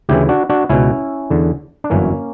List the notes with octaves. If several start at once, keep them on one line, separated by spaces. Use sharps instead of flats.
D2 C#3 E3 E4 G4
D4 F#4
D4 F#4
C#2 B2 C#4 E4
E2 D3
D4
G1 F#2 E3 A#3 C#4